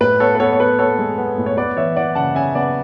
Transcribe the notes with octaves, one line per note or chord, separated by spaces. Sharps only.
A2 B4
B3 A4 C#5
B4
B3 A4 C#5
C#5
B3 B4
B3 A4 C#5
G#3
B3
A2
C#5
B3 B4 D5
E3 C#5 E5
E3 D5 F#5
C#3 F#5 A5
C#3 E5 G#5
B3 D5 F#5